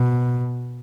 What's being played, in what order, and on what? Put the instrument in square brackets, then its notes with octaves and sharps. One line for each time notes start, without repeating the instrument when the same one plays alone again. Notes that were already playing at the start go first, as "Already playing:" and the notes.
Already playing: [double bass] B2